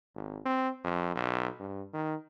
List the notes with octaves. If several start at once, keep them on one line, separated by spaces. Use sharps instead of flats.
G#1
C4
F2
B1
G2
D#3